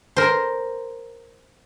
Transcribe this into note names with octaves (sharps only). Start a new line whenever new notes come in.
A#4 C5